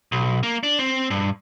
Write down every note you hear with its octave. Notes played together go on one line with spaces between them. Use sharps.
B1
A#3
D4
C4
G2